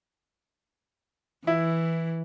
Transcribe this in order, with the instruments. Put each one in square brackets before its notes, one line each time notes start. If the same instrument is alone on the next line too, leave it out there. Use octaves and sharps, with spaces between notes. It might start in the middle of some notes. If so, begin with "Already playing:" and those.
[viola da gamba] E3 [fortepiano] E4